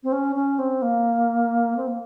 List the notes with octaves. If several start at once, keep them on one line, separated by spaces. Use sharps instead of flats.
C4
C#4
C#4
C4
A#3
C4
A#3